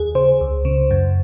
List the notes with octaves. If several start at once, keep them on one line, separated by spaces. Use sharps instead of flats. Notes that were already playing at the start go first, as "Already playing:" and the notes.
Already playing: D#2 G#4
C#3 C5
C#2
C#3
F#2